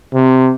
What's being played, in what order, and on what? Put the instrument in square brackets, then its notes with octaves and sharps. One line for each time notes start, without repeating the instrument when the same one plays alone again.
[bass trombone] C3